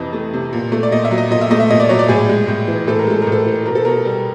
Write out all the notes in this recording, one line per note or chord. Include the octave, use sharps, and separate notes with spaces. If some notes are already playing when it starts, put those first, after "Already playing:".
Already playing: F2 C3 E3 D#5
A3
C3
A#2
A3
D5
A#2 D#5
E5
F#3
D#5
A#2 D#5
E5
A3 D#5
E5
A#2 D#5
D5
F#3 C#5
D5
A2 G#4
G#3
A2
E3
A2 A4
A#4
G#3 A4
A#4
A2
A4
E3
B2 A#4
A4
B2 A#4
G3